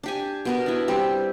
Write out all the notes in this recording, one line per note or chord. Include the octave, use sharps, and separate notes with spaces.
D4 G4 G#5
B2 B3 A#4
D4 E4
G3 C4 G4